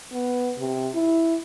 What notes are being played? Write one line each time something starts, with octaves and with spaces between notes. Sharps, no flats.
B3
C3
E4